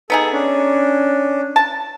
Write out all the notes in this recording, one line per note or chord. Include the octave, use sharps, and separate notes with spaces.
B3 D#4 G#4 A4
C#4 D4
A5